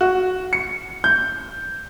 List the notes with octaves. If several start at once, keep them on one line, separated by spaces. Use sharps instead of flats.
F#4
C#7
G6